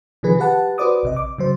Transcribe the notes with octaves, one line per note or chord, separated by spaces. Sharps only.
C3 D#3 F3 G#4 B4
G4 B4 F#5 A5
F#4 B4 C5 D5 D6 D#6
A#1 C3 D#5
D6
C#3 F#3 C5